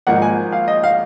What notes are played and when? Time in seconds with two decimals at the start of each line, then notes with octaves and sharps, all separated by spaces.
0.07 G#1 G#2 F3 A#3 D#4 F#5
0.22 G#5
0.52 F5
0.68 D#5
0.84 F5